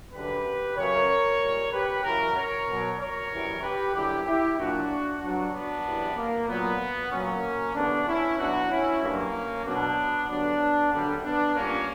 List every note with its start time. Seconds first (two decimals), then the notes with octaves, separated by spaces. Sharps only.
0.13 F#2 D3 G3 G4 B4
0.77 F#2 C#3 F#3 A#4 C#5
1.41 A#2 G3
1.73 G4 B4
2.04 F#2 C#3 E3 F#4 A#4
2.36 A#4 C#5
2.67 B2 F#3
2.99 A#4 C#5
3.32 F#2 E3 G3
3.63 G4 B4
3.94 F#2 D3 G3 E4 G4
4.26 E4 G4
4.58 A#2 F#3 D4 F#4
5.21 G2 F#3 D4 F#4
5.53 B3 D4
5.85 F#2 E3 G3
6.17 A#3
6.48 A#2 F#3 B3
7.12 A#2 F#3 A#3 C#4
7.75 E2 D3 G3 B3 D4
8.06 C#4 E4
8.39 B2 F#3 D4 F#4
8.70 C#4 E4
9.02 G2 F#3 A#3 C#4
9.65 B2 F#3 B3 D4
10.29 G2 D3 F#3 B3 D4
10.92 F#2 D3 G3
11.24 B3 D4
11.55 A#2 G3 A#3 C#4